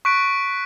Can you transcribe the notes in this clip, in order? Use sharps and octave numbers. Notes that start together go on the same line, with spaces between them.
C#6 F#6 B6 D7